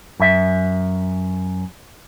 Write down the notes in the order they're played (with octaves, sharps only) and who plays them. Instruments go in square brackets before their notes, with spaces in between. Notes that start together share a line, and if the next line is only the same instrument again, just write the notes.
[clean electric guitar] F#2 E5